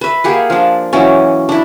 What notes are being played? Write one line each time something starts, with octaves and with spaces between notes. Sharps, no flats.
B4 E5
A#3 G4 G#4 F#5
F3 D4
E3 F#3 C#4
D4 E4